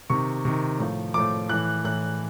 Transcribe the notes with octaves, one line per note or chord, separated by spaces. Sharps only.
C3 D#3 C#6
C3 D#3
A2 F3
A2 F3 D6
A2 E3 F#6
A2 E3 F#6